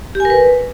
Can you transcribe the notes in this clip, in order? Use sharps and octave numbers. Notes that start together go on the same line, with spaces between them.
G4
G#5
A#4
B4